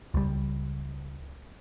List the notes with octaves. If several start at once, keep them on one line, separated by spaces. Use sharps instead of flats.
C#2 G3